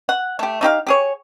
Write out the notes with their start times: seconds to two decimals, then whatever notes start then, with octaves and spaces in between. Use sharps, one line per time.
0.09 F#5
0.39 A3 G4
0.61 A3 D#4 G4 F5
0.87 G4 G#4 C#5